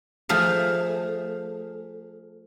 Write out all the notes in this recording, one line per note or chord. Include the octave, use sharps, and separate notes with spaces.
F3 A3 G#4 F5